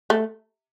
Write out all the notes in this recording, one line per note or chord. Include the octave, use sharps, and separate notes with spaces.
A3